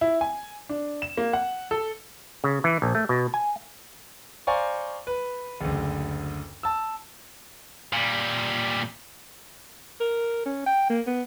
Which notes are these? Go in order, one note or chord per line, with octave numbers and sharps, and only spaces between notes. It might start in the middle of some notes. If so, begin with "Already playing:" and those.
E4
G#5
D4
E7
A#3
F#5
A4
C#3
E3
A#1
A3
B2
G#5
C5 D5 F5 G#5 A#5 C#6
B4
F#1 D2
A5 E6
A#2 G3
A#4
C#4
G5
A#3
B3